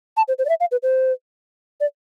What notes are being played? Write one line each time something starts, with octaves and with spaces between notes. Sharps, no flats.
A5
C5
C5
D5
E5
F5
B4
C5
D5